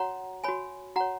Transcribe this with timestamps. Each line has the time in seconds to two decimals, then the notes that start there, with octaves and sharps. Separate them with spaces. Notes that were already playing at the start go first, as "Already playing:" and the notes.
Already playing: F#4 C#5 F#5 A#5
0.44 F#4 C#5 G#5 B5
0.96 F#4 C#5 F#5 A#5